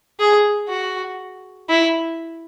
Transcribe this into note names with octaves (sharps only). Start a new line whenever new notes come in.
G#4
F#4
E4